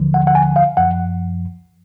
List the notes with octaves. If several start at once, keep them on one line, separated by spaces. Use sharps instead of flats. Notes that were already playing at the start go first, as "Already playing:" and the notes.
Already playing: D#2 D3 F3
F#5
F#5
G#5
F5
F#2 F3 F#5